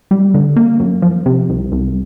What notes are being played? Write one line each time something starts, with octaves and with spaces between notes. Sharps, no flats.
G3
D3
A#3
F#2
F3
C3
C2
C2